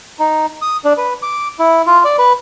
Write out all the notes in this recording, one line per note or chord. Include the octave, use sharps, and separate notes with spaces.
D#4
D#6
D4
B4
D6
E4
F4
D5
B4